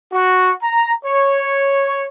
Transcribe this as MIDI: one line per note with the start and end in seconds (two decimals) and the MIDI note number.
0.12 0.52 66
0.63 0.94 82
1.05 2.06 73